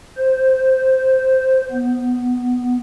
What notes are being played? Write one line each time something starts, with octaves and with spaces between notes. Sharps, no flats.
C5
B3